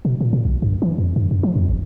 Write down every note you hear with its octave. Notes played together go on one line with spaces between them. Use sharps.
B2
A#2
A#2
B1
G2
E3
F2
G2
F#2
F3
F2
G1